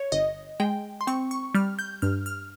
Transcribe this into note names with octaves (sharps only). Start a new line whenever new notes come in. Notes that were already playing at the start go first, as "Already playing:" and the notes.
Already playing: C#5
G1 D#5
G#3 G5
C6
C4 C#6
C#6
G3 F6
G6
G2 F6
F6